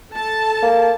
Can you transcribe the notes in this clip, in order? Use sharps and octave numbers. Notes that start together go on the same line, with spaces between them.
A4 A5
A#3